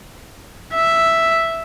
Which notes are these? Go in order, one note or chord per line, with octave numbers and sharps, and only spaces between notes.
E5